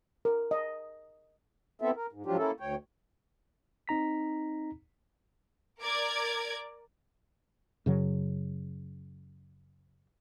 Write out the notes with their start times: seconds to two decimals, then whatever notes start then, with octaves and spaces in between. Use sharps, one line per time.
0.25 A#4
0.51 D#5
1.82 B3 C4 E4 A4 E5
1.97 A#4
2.12 G#2
2.26 G#2 F3 F#3 D4 F4 G4
2.37 A#3 C#4 E4 A4
2.60 D2 C#5 G5
3.88 C4 D#4 A#5 B6
5.81 A#4 D5 D6 G#6
7.86 F#2 C#3 F#3